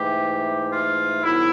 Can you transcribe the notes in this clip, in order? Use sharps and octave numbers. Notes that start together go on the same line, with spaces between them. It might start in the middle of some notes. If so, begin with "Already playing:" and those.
Already playing: G#2 E3 A3 G4
F4
G#2 D#3 F#3 B3 E4